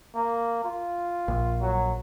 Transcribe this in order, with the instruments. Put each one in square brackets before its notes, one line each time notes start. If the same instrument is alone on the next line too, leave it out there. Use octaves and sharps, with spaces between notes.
[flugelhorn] A#3
F4
[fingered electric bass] A#1
[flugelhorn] F#3